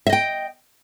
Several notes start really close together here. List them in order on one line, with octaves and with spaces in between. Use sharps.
E5 D#5 G5